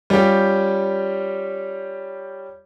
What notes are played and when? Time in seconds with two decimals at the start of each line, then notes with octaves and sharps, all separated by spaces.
0.10 G3 C#4 F4 G4